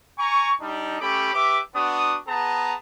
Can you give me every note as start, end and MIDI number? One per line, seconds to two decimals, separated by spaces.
0.19 0.52 80
0.19 0.52 82
0.19 0.52 85
0.60 0.98 55
0.60 0.98 62
0.60 0.98 63
1.00 1.32 57
1.00 1.32 61
1.00 1.32 67
1.00 1.32 83
1.00 1.32 86
1.34 1.59 67
1.34 1.59 71
1.34 1.59 76
1.34 1.59 86
1.75 2.16 59
1.75 2.16 62
1.75 2.16 66
1.75 2.16 87
2.27 2.74 59
2.27 2.74 68
2.27 2.74 81
2.27 2.74 82